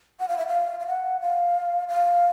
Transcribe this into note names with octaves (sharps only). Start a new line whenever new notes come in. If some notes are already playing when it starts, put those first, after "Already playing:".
F#5
F5
E5
F5
F5
F#5
F5
F5